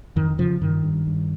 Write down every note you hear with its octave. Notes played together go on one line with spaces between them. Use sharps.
F2 D#3
C#3 F3
G2 D#3
G2
G2